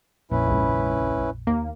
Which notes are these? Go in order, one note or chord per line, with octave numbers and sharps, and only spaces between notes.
A#1 F2 A#2 C#4 E4 B4
G#1 C#2
D#2 A#3